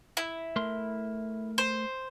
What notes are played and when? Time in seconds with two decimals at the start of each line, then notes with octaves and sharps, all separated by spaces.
0.17 E4
0.56 A3 A#4 C6
1.58 C5